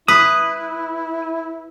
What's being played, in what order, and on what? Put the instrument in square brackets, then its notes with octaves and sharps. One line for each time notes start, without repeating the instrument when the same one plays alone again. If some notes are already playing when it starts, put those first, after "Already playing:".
[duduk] E4 [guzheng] B4 [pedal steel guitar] D#6